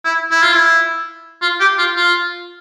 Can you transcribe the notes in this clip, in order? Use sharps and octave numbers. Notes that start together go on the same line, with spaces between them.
E4
E4
F4
E4
F4
G4
F4
F4